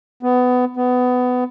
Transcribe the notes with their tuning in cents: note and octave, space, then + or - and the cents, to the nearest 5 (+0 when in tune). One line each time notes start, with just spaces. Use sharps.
B3 +20
B3 +20